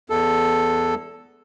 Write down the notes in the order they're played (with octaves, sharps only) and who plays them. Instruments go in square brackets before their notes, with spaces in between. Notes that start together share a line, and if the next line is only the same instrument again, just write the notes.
[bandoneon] E2 A4